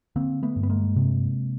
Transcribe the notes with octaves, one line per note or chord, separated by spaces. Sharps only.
D3 A#3 C4
A3 B3
G2
B3
G#3 A#3
C3